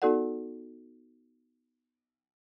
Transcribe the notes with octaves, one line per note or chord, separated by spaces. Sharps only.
B3 D#4 F#4 A4 D5 F#5